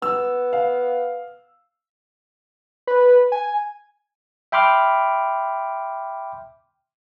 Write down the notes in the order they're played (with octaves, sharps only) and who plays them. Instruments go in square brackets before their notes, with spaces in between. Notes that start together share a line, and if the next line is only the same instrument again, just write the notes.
[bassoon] B3 [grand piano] E6
[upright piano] F5
[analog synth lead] B4
G#5
[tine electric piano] E5 G5 B5 C6 D6 F6